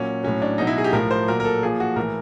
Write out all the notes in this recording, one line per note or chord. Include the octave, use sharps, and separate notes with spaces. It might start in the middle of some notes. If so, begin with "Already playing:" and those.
Already playing: A#2 F#3 C#4
A2 F#3 C#4
D4
B2 F#3 D#4
E4
G#4
G4
A2 F3 A#4
C5
A#2 F#3 A#4
A#4
A4
A#2 F3 G#4
F#4
A2 E3 A#4